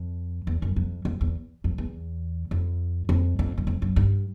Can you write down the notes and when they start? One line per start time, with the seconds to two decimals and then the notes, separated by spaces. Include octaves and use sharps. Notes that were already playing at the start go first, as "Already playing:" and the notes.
Already playing: F2
0.47 E2
0.62 F#2
0.76 F2
1.05 F2
1.21 E2
1.64 F2
1.78 E2
2.51 F2
3.09 F2
3.39 F2
3.58 F#2
3.67 F2
3.82 F#2
3.96 G2